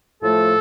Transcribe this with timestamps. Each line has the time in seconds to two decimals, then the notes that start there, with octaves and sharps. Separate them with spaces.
0.22 A2 F3 A3 A4